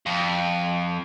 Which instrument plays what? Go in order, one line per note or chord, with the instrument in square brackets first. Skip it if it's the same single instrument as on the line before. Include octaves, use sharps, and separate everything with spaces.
[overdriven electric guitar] F2